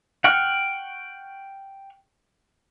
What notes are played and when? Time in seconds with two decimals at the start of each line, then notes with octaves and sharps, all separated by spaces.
0.24 F#5 G5 C#6 F6